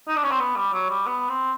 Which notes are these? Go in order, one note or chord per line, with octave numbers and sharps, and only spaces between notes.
D#4
D4
C#4
C4
B3
G3
F#3
G3
B3
C4